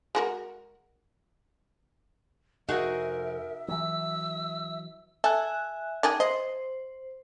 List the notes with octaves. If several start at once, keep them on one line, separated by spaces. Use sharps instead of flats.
G#3 F#4 A#4
F2 C3 D#4 F#4 G#4 A#4 E5
E3 F#3 E6
A4 E5 G#5 F#6
D#3 D4 G#4
C5 D#5